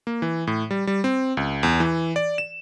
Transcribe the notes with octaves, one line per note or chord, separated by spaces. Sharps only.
A#3
E3
A2
G3
G3
C4
C#2
E2
E3
D5
E7